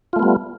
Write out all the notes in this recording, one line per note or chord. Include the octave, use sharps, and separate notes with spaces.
G3 A3 B3 F4